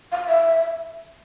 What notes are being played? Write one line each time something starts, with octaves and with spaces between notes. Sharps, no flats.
F5
E5